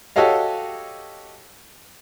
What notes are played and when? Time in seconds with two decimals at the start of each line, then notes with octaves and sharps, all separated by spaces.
0.16 F#4 G4 A4 C#5 D#5 F5